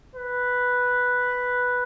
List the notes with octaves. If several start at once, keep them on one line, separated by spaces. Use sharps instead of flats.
B4